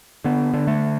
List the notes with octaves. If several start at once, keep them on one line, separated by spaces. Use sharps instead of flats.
D3 B3
D3
A3